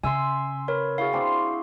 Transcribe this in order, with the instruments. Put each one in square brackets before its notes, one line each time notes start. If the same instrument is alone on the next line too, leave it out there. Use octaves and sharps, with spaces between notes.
[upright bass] C#3 [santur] E5 C6 [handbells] G#5 E6
[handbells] A#4 C#5 [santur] B4
[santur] E4 F#4 [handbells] G#4 F5
[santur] C4 D4 C6